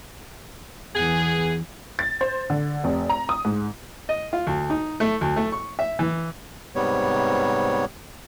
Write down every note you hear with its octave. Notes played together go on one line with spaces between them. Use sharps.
E2 E3 B3 G#4
A6
C5
D3
F1
A#5
D#6
G#2
D#5
F4
D2
D#4
A3
D2
A3
C#6
E5
E3
G#2 C3 G3 B3 C#5